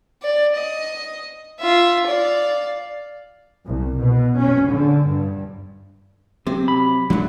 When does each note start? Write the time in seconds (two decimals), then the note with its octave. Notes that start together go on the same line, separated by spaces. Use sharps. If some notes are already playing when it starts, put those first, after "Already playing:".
0.23 D5
0.55 D#5
1.60 F4 E5
2.07 D5 F5
3.67 C2
4.00 B2
4.38 C#4
4.70 D3
5.06 G2
6.47 C3 F#3
6.68 B5
7.10 D3 E3 F#3 G#3 A3